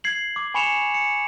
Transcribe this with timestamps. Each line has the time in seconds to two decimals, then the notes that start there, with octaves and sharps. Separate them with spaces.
0.04 G#6 C7 F#7
0.36 D6
0.54 G#5 B5 C#6 C#7 E7 F7
0.94 C#7